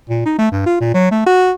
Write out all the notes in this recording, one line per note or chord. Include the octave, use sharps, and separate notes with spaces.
A#2
D#4
A3
G2
F4
A#2
F#3
A3
F#4